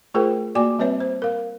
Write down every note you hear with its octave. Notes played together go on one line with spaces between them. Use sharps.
A3 F4 G#4 A#4 C5 G5
A#3 F#4 D5 G#5 D6
G3 C4 B4 C#5 E5
C5
A#4 F5